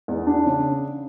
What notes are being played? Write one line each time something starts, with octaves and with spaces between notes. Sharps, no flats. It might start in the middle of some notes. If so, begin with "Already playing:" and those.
E2
D4
C#3